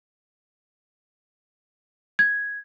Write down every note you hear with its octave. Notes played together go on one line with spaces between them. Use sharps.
G#6